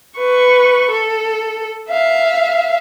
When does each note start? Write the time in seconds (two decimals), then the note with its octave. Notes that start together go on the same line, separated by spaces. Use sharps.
0.18 B4 C#6
0.91 A4
1.90 E5 F5